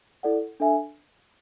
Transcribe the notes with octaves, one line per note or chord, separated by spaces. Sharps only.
E4 A4 D5 F#5
D4 A4 E5 G#5